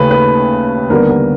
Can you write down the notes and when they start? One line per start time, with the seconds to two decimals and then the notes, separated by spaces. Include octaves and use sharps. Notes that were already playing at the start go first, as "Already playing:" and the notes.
Already playing: D#2 C#3 A3 B4
0.11 B4
0.90 D#2 D3 G3 B3 A#4
1.09 A#4